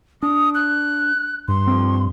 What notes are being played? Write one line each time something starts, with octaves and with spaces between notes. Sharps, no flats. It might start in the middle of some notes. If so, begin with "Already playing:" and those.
D4 D#6
F#6
G2 C6
F3 C4